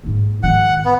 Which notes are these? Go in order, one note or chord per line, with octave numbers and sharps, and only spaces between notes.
G#2 A#3
G#2 D#3 F#5
B3